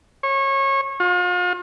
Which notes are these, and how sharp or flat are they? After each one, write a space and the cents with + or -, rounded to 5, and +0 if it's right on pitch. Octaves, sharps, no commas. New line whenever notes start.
C#5 -25
F4 +40